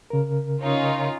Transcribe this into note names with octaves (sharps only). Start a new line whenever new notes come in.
C#3 A#4
C#4 D#4 F4